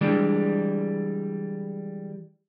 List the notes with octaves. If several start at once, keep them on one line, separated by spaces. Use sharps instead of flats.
E3 G3 G#3 D4